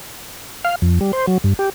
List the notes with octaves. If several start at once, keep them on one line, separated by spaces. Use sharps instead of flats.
F5
F2
G3
C5
F#3
G2
G4